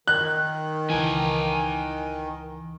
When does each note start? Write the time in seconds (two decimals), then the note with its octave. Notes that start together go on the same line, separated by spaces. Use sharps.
0.07 D#3 F#6
0.90 C#2 E3 B4 G5 G#5